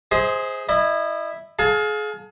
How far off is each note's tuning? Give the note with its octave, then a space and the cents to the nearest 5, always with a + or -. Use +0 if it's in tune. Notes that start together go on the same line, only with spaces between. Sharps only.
G#4 +0 C5 +0 D#5 +40
E4 +0 D#5 -30
G#4 +35 F5 +25 A5 +10